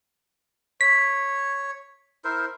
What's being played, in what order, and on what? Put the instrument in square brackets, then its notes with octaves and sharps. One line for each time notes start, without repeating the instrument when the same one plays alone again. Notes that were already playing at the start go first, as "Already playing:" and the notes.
[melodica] C#5 [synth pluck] B6
[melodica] E4 A#4 C5